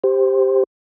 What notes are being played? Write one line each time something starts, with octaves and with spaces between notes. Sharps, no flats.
G4 C5